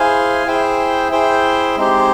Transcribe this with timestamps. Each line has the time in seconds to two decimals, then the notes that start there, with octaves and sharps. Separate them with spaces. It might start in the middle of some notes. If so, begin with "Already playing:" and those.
Already playing: E4 G#4 C5 F5 G#5
0.47 E4 G#4 C5 E5 G5
1.11 E4 G#4 C5 E5 G5
1.77 G#3 C4 D#4 G4 C5